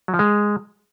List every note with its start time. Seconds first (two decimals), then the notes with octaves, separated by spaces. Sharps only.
0.08 F#3
0.14 F3
0.19 G#3